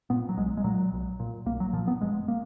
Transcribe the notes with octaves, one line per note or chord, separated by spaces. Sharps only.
A#2 B3
F#3
B1 G#3
G#3
A#2 F#3
B1
A#2
B1 A#3
F#3
A#2 F3
B3
F#1 G#3
A#3